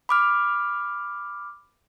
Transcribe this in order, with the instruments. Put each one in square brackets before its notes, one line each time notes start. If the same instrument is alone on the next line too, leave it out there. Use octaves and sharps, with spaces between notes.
[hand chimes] B5 D6 F6